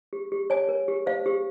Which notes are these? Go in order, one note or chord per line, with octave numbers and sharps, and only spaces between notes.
G4
G4
C#5 G#5
A#4
G4
C5 F5
G4